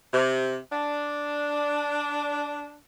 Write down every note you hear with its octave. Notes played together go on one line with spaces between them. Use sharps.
C3
D4